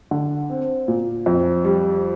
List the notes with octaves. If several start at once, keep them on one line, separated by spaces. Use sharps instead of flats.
D3
C4
A#2
F2
G3